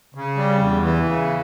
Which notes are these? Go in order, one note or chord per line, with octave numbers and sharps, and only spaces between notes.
C#3
G3
E2
E3
C#3